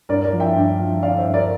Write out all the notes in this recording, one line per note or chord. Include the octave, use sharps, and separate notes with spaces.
G2 A#4 D5
A#4 D5
F3
E5 G5
G2
F3
D3 D5 F5
C5 E5
G2
A#4 D5